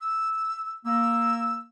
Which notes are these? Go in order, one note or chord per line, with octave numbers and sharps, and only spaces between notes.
E6
A#3 E6